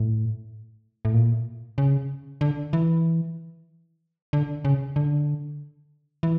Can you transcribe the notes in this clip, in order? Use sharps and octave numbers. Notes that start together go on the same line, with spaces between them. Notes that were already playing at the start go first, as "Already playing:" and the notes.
Already playing: A2
A2
A#2
C#3
D3
E3
D3
C#3
D3
E3